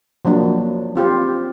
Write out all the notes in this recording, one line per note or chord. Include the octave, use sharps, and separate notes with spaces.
F3 F#3 A#3 D4
C4 F4 G4 C5